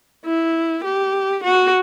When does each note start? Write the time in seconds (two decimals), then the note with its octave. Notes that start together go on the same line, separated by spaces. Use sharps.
0.25 E4
0.84 G4
1.44 F#4